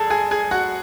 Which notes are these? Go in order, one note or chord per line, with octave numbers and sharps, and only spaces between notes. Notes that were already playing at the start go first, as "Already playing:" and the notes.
Already playing: F#1 G#4 A4 A5
G#4 G#5
G#4 G#5
F#4 F#5